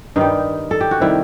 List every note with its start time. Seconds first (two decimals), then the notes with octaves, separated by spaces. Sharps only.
0.16 G2 D#3 G3 D#4
0.71 A4
0.81 G4
0.91 F#4
1.00 C3 D#3 G3 E4